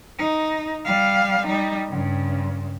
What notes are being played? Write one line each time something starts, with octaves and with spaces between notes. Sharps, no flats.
D#4
G3 F5
G3 D#4
G2 C#3